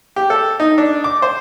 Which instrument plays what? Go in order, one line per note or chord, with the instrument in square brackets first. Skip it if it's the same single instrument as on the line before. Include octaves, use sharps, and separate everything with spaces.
[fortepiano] G4
A4
D#4
D4
D6
C5